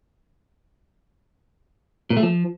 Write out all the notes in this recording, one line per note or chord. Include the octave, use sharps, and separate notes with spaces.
A#2
A3
F3